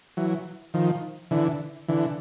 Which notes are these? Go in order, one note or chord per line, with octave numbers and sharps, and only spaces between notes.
E3 F#3
D#3 F3
D3 E3
D3 E3